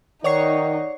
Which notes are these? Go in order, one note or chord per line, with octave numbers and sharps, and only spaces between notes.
D#3 D#4 C#5 D5 F#5 C#6 C7